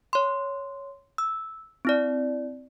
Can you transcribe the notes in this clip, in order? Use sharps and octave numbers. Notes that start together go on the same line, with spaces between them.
C#5 C6
E6
C4 E4 D5